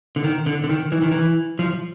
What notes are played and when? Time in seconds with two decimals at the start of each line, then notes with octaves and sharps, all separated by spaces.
0.16 D3
0.24 D#3
0.46 D3
0.64 D3
0.69 D#3
0.92 E3
1.02 D#3
1.11 E3
1.59 F3